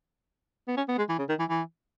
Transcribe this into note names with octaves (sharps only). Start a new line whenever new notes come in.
B3
C#4
B3
G#3
E3
C#3
D#3
E3
E3